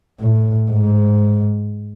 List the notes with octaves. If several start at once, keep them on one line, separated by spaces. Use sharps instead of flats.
A2
G#2